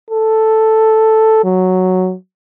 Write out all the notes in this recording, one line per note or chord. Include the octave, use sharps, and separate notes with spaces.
A4
F#3